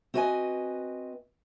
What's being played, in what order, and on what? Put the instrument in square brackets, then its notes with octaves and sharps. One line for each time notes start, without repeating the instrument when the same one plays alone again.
[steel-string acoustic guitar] C4 F#4 B4 C#5 D#5 G#5